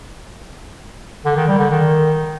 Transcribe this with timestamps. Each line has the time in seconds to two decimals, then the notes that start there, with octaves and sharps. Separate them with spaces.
1.25 D3
1.36 D#3
1.48 G3
1.59 D3
1.70 D#3